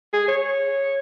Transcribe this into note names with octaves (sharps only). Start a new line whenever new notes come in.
G#4
C#5